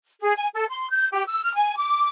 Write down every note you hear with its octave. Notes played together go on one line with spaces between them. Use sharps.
G#4
G#5
A4
C6
G6
G4
E6
F6
G#5
D6